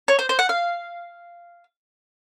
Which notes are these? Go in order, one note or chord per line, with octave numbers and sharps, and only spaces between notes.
C#5
C5
C5
F#5
F5